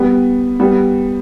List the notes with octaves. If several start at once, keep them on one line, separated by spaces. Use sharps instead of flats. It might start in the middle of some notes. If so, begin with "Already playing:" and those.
Already playing: G3 B3
G3 B3